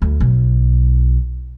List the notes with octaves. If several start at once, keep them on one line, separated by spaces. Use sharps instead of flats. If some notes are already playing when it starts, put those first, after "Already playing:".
D2
B1